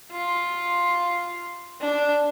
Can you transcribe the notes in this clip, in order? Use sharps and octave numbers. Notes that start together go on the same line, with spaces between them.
F4
D4